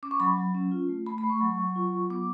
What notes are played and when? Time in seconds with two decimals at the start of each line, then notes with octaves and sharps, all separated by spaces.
0.03 C#4 D6
0.11 C#6
0.20 F#3 B5
0.37 F#3
0.55 C#4
0.71 F4
0.89 A3
1.06 A3 B5
1.18 B5
1.23 A3
1.30 C#6
1.41 F#3
1.58 F#3
1.76 F4
1.93 F#3
2.10 B3 D6